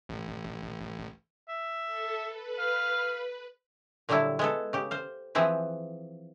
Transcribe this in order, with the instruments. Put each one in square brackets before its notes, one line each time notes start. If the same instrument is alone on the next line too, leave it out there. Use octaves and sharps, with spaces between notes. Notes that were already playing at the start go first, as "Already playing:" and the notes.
[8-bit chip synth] A1
[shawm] E5
[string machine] A4
B4
[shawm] F5
[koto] A#2 D3 F#3 G3 E4 A4
G#3 B3 A4
C#3 G4
C5 F5
E3 F3 C4 G#4 B4